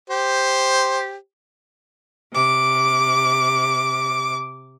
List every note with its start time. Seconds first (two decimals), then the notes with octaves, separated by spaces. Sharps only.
0.10 G4 C5
2.33 C3 D6